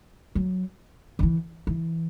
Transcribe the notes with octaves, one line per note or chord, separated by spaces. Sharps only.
F#3
D#3
E3
E3